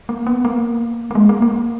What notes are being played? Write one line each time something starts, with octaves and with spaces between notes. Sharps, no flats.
A#3
B3
A#3
A#3
G#3
A#3
A#3